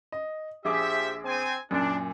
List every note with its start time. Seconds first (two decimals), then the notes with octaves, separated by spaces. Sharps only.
0.12 D#5
0.65 A#1 F3 G4 G#4 E5 D6
1.24 C4 G#5
1.71 F#2 A#2 D4